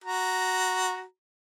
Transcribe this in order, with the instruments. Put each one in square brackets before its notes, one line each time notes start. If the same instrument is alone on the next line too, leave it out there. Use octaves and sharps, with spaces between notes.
[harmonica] F#4 A#5